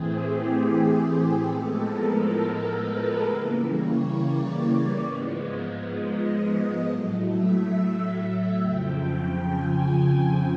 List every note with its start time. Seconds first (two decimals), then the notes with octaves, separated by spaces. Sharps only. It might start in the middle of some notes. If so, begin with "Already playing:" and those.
Already playing: A2 E3 A3 C4 G#4
0.09 G4
0.98 G#4
1.43 A2 F3 G#3 B3 A4
1.88 A#4
2.78 B4
3.22 C#3 E3 G3 A#3
3.67 C#5
4.12 D5
4.57 D5
5.02 G#2 F3 G#3 B3
5.91 D#5
6.81 A2 F#3 A3
7.26 E5
8.60 F2 C#3 F3 G5
9.50 G#5